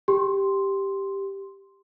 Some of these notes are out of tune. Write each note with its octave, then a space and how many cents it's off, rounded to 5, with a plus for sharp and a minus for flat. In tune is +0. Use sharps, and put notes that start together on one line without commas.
G4 +0 C6 +0